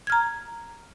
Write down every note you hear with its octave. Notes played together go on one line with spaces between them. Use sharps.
A#5 F6 G#6